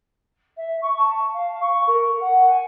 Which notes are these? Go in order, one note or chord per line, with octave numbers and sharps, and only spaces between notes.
E5
C#6
A5
F5
C#6
A#4
F#5
G#5